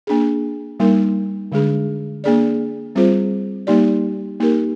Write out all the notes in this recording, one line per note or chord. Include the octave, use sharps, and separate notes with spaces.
A#3 D4 G#4
G3 A#3 D#4 A#4
D3 G#3 D4 G#4
A#3 D4 G#4 D5
G3 C4 F4 G#4 C5
G3 A#3 D#4 G4 D5
A#3 D#4 G4 A#4